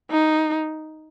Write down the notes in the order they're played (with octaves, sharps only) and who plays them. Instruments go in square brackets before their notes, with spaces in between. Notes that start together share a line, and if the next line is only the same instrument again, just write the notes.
[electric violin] D#4